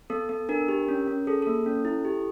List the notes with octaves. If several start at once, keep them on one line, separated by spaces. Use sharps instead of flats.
B3 A4
B3 A4
D4 A#4
G4
C#4
C#4
G#4 A4
A#3 A4
C#4
E4
G4